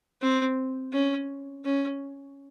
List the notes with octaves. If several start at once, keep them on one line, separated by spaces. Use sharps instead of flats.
C4
C#4
C#4